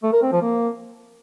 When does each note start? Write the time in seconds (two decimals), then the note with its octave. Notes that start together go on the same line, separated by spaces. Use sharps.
0.03 A3
0.13 A#4
0.22 C4
0.32 F3
0.42 A#3